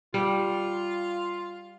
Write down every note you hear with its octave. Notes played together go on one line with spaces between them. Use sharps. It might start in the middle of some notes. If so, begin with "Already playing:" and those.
G3 F4